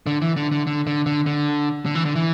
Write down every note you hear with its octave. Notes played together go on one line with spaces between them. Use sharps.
D3
E3
D3
D3
D3
D3
D3
D3
D3
E3
D3
E3